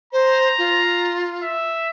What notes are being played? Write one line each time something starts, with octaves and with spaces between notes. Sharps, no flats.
C5 A#5
F4
E5